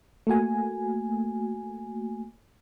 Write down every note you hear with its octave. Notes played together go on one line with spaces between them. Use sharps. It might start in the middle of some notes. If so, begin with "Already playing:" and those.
A3 A#3 F#4 G#5